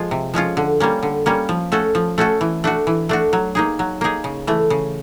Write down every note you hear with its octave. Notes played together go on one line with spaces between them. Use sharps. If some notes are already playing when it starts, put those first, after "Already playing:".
Already playing: F3 G#3 F4
C3
F3 G#3 C#4 F4
D3
G3 A#3 C#4
D3
G3 A#3 C#4
F3
A3 C#4 F#4 A4
F3
A3 C#4 F#4 A4
E3
A3 D4 F#4
E3
A3 D4 F#4
F#3
A#3 D#4 G#4
F#3
A#3 D#4 G#4
C#3
E3 A3
C#3